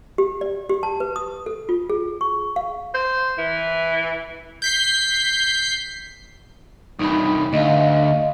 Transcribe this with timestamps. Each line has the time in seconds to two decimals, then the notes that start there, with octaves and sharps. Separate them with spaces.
0.18 G4
0.41 D5
0.69 G4
0.83 A5
1.00 B4
1.16 D#6
1.46 A4
1.69 F4
1.90 G#4
2.21 C#6
2.56 F5
2.94 C5
3.38 E3
4.62 G6 B6 C7
6.99 C2 G2 D#4 B5
7.53 D2 D#5 F5